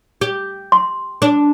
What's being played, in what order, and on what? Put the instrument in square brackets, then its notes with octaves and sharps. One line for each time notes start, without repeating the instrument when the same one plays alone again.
[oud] G4
[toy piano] C6
[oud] D4